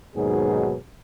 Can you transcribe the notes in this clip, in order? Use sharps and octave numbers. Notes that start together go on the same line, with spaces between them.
D#2 G#2 B2 F#3 D#4 G#4